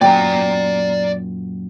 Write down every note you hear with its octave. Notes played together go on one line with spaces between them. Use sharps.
F#2 A#2 D5 G5 A#5